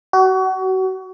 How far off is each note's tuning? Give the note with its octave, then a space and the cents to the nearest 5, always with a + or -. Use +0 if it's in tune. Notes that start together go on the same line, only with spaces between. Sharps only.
F#4 +30